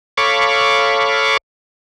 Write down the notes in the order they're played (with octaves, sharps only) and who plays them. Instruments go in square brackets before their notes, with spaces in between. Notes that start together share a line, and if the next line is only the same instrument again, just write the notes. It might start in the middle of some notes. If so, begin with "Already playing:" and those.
[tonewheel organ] A4 C#5 F5 B5 C#6 D6